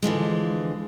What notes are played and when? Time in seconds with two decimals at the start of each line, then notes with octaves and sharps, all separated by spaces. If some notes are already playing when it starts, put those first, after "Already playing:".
0.02 D3 E3 F3 G#3